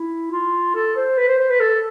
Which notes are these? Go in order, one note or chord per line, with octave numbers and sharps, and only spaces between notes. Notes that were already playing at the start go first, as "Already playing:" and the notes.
Already playing: E4
F4
A4
C5
B4
C5
C5
B4
A4